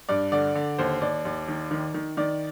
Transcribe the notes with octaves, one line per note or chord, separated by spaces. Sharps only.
G2 D5
D3 D5
D3
D#2 C5
D#2 D5
D#2
D#3
D#3
D#3
D#3 D5